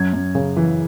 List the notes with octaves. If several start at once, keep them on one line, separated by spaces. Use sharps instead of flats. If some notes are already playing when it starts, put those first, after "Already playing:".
Already playing: F#2 G#6
F#2
C#3
E3